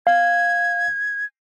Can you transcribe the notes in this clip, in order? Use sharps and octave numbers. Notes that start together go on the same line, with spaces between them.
F5 G#6